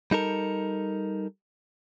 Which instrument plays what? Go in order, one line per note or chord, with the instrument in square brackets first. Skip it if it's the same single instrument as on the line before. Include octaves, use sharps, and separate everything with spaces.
[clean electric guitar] G3 D#4 A4 A#4